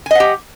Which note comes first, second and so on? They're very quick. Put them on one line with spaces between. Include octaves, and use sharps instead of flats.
G#5 D#5 F#5 G4